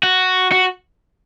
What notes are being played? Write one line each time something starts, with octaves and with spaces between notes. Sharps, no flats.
F#4
F#4